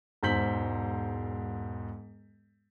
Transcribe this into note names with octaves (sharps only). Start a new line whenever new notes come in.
E1 G#2 C5 G6 B6 F#7